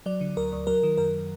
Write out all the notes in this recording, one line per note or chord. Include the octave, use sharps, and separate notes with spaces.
F#3 D5
D3
D2 A#4
D2
F#3 A#4
D#3
F#2 A#4